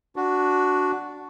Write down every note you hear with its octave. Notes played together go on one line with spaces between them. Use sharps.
D4 F#4